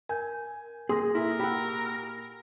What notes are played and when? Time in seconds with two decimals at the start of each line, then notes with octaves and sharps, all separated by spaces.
0.09 A#4 G#5 G6
0.89 A#2 G#4 C6 D#6 A#6
1.15 E4 A4 A#4 B6
1.40 G4 F#5 B5 E6